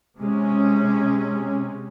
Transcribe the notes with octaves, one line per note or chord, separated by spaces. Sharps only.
C3 G#3 C#4